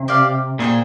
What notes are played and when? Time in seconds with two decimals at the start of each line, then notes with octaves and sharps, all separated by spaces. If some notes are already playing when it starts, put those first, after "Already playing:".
Already playing: C3
0.08 G4 D5 F5
0.59 A#2 G#4 C5 G5